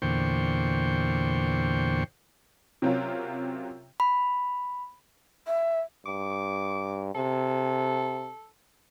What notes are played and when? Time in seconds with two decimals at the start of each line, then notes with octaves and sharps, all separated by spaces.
0.02 E2 A#2 D3 C5 G5 C#6
2.82 C3 F#3 C4 C#4 F4 A#4
4.00 B5
5.47 E5
6.06 G2 D6
7.15 C3 A4